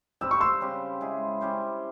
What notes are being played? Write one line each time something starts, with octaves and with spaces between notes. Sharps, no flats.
G2 G3 C4 E6
C#6
C6 E6
C#3 G3 C4 G4
G#3 E4 G#4
G3 C#4 G4 C5